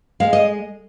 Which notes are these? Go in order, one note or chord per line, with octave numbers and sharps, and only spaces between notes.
G#3 F5
D#5